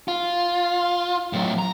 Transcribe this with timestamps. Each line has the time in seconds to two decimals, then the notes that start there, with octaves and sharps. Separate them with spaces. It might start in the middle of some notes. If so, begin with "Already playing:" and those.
0.08 F4
1.33 A2 F#3
1.59 A#5